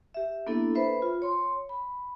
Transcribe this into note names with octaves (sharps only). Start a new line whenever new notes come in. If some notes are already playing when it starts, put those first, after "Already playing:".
G4 E5
A#3 B3 D4 E4 A4
B4 C5 E5 B5
F4
C#5 C6
B5